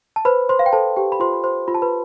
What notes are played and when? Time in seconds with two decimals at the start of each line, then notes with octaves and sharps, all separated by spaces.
0.16 A5
0.25 B4 C5 B5
0.49 C5 C6
0.59 F5
0.66 G5
0.72 A4 C5 A5
0.96 G4 G5
1.12 B5
1.20 F4 C5 C6
1.33 B5
1.44 C5 C6
1.68 F4 B5
1.74 A5
1.82 B4 B5